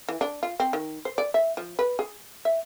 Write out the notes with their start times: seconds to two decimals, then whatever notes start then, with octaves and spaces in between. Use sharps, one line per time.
0.09 E3
0.21 D4
0.43 F4
0.60 C4
0.73 D#3
1.05 C5
1.18 D5
1.34 E5
1.57 F3
1.79 B4
1.99 G#4
2.45 E5